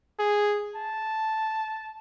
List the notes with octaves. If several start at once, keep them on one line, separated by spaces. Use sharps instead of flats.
G#4
A5